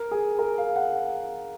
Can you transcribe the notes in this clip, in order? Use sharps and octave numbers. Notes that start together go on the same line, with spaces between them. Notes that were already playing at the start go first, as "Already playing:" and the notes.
Already playing: A#4
G#4
A#4
F5
F#5